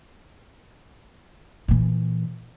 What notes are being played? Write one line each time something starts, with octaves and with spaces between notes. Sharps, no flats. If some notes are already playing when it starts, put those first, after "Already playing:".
A#2 E3